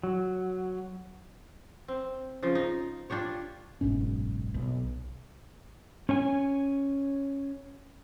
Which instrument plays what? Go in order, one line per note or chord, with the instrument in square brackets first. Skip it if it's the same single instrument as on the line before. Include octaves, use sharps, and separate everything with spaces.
[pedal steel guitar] F#3
[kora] C4
C#3 F3 F4
D#4
D4 F4 G4 C#5
[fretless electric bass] F#1 B1 G#2 C#4
B1
[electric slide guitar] C#4 C#5 G#5